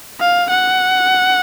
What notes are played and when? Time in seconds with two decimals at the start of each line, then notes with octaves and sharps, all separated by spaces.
0.20 F5
0.50 F#5